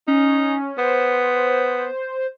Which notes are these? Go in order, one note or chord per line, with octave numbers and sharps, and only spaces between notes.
C#4 D#4
B3 C5